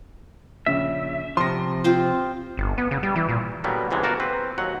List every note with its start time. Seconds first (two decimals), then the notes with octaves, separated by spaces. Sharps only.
0.66 A#1 C#3 E5
1.37 C3 F3 C6 A#6
1.84 C4 F4 C5
2.57 G1
2.78 B3
2.91 C#3
3.03 G3
3.16 E3
3.29 A#2
3.64 D3 F#3 G3 A#3 B3
3.91 C#2 C3 E3 G#3 A3
4.03 G1 A#3 F#4 A#4 A5
4.20 C4 B4
4.58 D#2 F#3 F#5